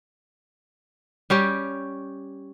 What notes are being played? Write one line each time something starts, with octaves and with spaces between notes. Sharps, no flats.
G3 C#4 G4